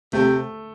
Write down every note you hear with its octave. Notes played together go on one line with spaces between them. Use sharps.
C3 A3